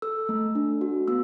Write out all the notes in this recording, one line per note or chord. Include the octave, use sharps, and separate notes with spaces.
A4 E6
A3
D4
F#4
B3 E6